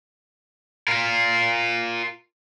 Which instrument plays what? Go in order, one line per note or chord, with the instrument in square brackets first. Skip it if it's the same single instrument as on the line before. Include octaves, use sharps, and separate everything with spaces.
[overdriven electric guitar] F4 A#4